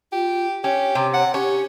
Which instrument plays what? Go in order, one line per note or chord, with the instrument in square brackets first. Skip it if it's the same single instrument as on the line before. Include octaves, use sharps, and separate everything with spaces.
[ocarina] F4 [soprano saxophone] G4
[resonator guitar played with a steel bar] C#4 [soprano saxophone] G4 [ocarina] C#5
[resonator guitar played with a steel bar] C3
[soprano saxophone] F#5
[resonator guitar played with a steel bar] C#4 [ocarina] G4 [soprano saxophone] C#5